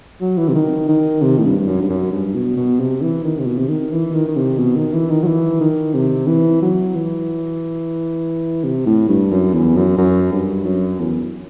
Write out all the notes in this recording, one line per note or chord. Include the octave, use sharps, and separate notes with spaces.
F#3
E3
C3
D#3
D#3
C3
A2
G2
G2
F#2
G2
F#2
G2
B2
B2
C3
E3
D#3
C3
B2
C3
D#3
E3
D#3
D#3
C3
B2
D#3
E3
D#3
F#3
E3
D#3
C3
E3
F#3
E3
C3
A2
G2
F#2
E2
F#2
F#2
G2
F#2
E2